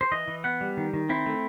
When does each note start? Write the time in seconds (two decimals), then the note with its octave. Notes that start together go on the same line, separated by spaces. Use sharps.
0.01 C5
0.11 E3 D#5
0.28 E3
0.44 B3 F#5
0.61 G3
0.77 D#3
0.93 D#3
1.09 C4 E4
1.26 A3